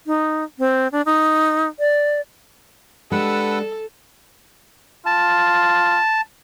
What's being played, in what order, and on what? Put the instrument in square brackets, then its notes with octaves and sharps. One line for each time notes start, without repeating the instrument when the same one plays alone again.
[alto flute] D#4
C4
D4
D#4
D5
[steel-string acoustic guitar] G#3 D4 G4 [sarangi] A4 [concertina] B4 F#5 E6
[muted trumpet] F4 [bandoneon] A5